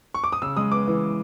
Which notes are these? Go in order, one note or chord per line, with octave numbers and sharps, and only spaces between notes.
C#6
D6
D#6
C#3 E6
G#3 D#6
B3 D6
E3